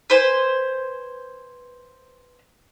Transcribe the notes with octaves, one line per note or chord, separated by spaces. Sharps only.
B4 C5 G#5